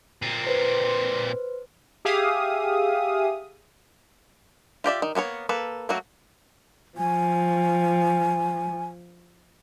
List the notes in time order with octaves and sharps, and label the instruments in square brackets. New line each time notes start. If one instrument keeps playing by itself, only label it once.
[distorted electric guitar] A#2 C4
[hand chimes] B4 C5
[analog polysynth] G4 G#4 E5 F5 D#6
[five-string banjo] F4 G4 D5 E5
D#3
A#3 B3 A4 C#5
A#3 A4 B4
F#3 A3 A#3 F#4
[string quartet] F3 [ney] G#5